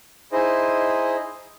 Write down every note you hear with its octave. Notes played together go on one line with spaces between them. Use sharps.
D#4 E4 G#4 C5 D#5